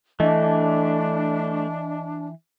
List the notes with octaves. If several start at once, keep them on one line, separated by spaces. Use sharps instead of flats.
E3 A3 D4 D#5